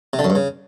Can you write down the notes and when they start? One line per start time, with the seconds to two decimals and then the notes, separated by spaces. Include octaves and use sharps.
0.13 C3
0.19 D3
0.24 F#2
0.30 G2
0.35 C#3